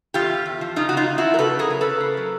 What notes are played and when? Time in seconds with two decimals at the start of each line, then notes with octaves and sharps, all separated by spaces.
0.14 E2 F4 G4
0.29 E2
0.46 E2
0.61 F3
0.76 C#3 D#4 F4
0.89 F#4
0.92 C#3 D#4 F4
1.08 E2
1.18 E4 F#4
1.24 F3
1.34 A#4
1.39 C#3 A4 B4
1.55 C#3 G#4 A#4
1.70 F#3
1.81 C#3 A4 B4
2.01 A#3
2.17 F#3